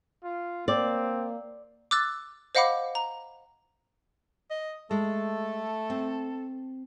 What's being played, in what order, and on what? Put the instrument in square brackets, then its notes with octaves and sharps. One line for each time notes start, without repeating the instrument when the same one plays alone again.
[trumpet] F4
[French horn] A#3 [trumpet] C4 [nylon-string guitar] D5
[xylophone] D6 E6 F#6 A6
C5 D#5 F5 F#5 B5 D6
A#5
[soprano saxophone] D#5
[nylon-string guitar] G#3 [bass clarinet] A3 [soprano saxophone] A4
[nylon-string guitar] C4